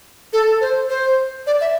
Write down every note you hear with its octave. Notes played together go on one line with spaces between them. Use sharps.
A4
C5
C5
D5
E5